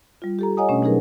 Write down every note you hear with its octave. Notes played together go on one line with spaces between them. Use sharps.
G3 F4
G4 A4 A#5
C#5 D#5 F#5 G#5 A#5 D#6
B2 A3 C#4 D4
F#3 D#4 G#4 A#4 B4